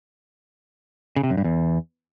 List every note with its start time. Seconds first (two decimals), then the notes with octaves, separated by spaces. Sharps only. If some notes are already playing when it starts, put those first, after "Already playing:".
1.16 C#3
1.23 C3
1.30 F#2
1.37 G2
1.44 E2